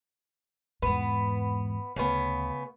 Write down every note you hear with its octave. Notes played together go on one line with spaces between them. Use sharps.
E2 G#2 B3
D2 C#3 B3